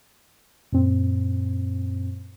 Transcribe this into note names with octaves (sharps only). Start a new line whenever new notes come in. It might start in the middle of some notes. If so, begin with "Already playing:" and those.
F#2 A#2 C4